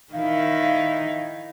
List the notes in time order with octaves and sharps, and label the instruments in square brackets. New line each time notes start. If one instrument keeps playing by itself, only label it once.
[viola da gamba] D#3 D#4 E4 [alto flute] F5